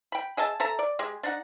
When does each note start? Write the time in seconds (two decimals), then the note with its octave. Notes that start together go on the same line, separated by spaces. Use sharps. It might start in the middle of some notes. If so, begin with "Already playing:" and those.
0.12 G5 B5
0.37 G#4 D#5 E5 A5
0.60 A4 E5 A5 A#5
0.79 D5
0.99 G#3 G4 G#4
1.23 D4 D#4 F#5